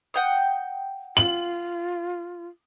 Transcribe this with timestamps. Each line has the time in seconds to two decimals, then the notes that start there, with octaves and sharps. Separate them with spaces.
0.14 F#5 G5 D#6
1.17 F4 F#7